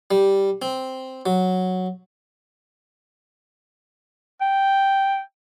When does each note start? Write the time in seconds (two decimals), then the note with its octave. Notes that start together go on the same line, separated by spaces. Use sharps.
0.11 G3
0.62 C4
1.26 F#3
4.41 G5